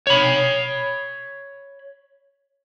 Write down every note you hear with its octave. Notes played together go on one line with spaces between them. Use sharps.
C#5 B5